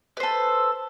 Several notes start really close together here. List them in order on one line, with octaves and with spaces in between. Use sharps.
B4 C5 A4